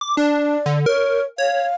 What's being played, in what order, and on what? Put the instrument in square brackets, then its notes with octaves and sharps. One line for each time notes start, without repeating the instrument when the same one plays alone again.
[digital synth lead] D6
[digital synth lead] D4 [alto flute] D5
[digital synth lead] D3
[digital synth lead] A#4 [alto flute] C#5
[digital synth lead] C#5 [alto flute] F5